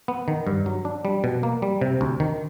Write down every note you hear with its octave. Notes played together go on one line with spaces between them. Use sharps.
B3
D#3
G2
F#3
D4
G3
B2
A#3
G3
C3
D2
D#3